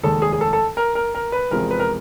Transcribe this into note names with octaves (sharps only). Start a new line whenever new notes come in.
F1 D#2 D#3 G#3 A4
G#4
G#4
A4
A4
A#4
A#4
A#4
B4
E2 C3 F3 G#3 A#4
B4
A#4